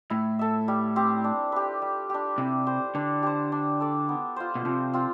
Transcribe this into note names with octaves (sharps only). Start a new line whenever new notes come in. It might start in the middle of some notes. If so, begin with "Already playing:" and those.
A2 E4
A4 E5
G3
C4 G4
D4
G4 B4
G3
D4 G4
C3 E4
G4 C5
D3 D4
G4 C5
D4
A4 D5
B3
F4 C5
B2
C3 F3
C4 F4